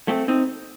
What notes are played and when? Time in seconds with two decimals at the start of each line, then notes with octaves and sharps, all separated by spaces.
0.08 A3 C4
0.28 C4 D#4